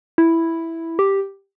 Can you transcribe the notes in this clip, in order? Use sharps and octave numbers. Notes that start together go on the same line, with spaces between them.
E4
G4